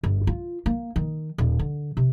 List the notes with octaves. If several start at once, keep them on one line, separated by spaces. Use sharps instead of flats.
G1
F4
A#3
D#3
D#1
D3
C3